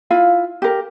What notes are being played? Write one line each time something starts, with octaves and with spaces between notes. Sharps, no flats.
E4 F4 F5
G4 A#4